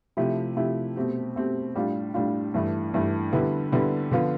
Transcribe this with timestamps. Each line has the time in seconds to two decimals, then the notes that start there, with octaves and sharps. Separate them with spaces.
0.17 C3 F3 A3 E4 G4
0.56 C3 F3 A3 E4 G4
0.96 B2 A3 C4 G4
1.36 B2 A3 C4 G4
1.75 A2 G3 D4 F4
2.14 A2 G3 D4 F4
2.54 G2 E3 A3
2.94 G2 E3 A3
3.33 D3 G3 B3 E4
3.72 D3 G3 B3 E4
4.11 D3 F3 B3 F4